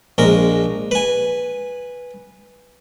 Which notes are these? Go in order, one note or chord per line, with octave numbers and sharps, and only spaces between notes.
A#1 G#3 A#4
B4 G#5